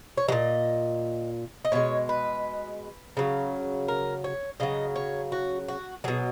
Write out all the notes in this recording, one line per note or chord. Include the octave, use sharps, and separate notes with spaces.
C#5
A#2 F#3 D#5
D#5
B2 G#3 C#5
B4
C#3 F#3
A#4
C#5
C#3 F#3 D#5
C#5
F#4
F#4
B2 F#3 G#4